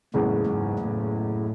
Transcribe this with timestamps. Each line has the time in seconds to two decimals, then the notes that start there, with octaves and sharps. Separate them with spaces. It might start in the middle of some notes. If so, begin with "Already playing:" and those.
0.14 F#1 E2 A2 C#3 G#3
0.46 G#2
0.79 A2